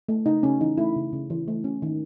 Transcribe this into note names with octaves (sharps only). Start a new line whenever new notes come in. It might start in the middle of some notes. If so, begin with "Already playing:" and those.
A3
C#3 D#4
C#3 C#4
E3 D#4
A3 E4
C#3
C#3
E3
A3
C#4
D#3